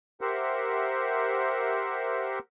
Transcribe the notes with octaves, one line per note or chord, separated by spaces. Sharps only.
G4 A#4 C5 E5 F#5